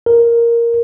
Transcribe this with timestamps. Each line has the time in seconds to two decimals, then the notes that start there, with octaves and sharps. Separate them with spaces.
0.06 A#4